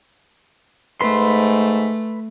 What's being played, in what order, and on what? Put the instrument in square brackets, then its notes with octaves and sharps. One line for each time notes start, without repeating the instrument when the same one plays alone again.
[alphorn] G#2 [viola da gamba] A3 [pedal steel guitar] B4 C6